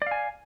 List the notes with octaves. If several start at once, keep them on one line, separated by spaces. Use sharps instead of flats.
D5 F5 G#5